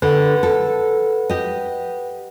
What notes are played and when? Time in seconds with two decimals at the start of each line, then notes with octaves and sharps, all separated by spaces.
0.02 D3 B4 F#5
0.43 A4
1.30 G4 D#5